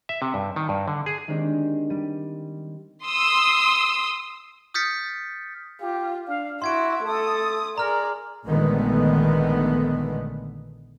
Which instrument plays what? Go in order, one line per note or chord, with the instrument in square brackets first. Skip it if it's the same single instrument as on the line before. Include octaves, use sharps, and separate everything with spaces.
[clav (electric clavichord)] E5
C3
G2
D#3
G2
D3
G#4
[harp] D#3 G#3 C4 D4 G4
G3 D#7
[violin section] C6 D#6 E6
[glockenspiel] D#6 F6 G6 A6 B6 C#7
[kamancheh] F4 [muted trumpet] G4
[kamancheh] D4 [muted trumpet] F5
[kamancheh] E4 E5 [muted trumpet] F#4 [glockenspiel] C6 G#6 D7
[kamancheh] A3 D#6 [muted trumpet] A4
[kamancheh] G#4 D5 [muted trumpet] A#4 [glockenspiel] A#5 F6
[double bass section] A#1 D3 D#3 G#3 A3 B3